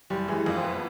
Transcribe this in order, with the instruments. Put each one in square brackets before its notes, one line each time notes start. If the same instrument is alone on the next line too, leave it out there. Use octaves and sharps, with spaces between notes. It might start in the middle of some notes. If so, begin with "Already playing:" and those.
[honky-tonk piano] F#1 [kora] G3
[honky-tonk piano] E3 [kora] G#3
[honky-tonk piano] F2 [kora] A#3
[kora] C4
B3